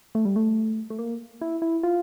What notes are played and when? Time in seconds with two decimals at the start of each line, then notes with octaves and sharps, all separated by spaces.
0.15 A3
0.25 G3
0.36 A3
0.90 A3
0.99 A#3
1.41 E4
1.62 E4
1.83 F4